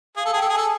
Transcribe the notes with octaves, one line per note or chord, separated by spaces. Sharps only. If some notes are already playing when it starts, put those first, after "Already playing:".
G#4 F5
A4
G#4 G5
A4
G#4
A4 G#5